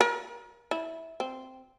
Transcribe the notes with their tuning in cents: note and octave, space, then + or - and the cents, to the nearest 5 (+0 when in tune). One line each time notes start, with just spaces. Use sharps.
A#4 +30
E4 -15
C4 -5